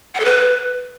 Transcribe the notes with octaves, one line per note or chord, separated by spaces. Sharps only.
F#5
A4
B4